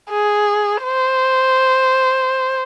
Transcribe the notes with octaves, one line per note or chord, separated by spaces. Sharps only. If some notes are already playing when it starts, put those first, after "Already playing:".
G#4
C5